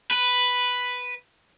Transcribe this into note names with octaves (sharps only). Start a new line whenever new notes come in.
B4